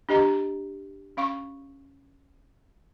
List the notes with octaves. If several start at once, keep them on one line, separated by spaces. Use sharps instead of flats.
D4 G4 D#5 A#5
C#4 F5 C#6